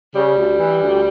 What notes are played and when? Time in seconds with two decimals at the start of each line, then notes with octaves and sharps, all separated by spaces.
0.15 C#3 G3
0.37 D2
0.59 E3
0.82 D2